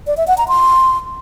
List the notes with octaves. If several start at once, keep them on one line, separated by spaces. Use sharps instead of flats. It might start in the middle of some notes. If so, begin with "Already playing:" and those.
D5
E5
F#5
A#5
C6